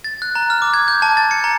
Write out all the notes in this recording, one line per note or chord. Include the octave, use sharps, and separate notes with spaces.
A6
F#6
A#5
F6
D6
G#6
G6
A5
A6
C#7
A#5